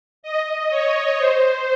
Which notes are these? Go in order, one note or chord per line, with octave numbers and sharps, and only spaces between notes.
D#5
C#5
C5